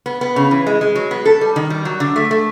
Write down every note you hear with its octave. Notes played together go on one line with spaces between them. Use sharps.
B3
B3
C#3
E3
G#3
G#3
F#3
B3
A4
G3
D#3
G3
F#3
D3
A3
A3